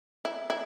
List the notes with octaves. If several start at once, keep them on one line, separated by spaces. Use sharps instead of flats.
E4
E4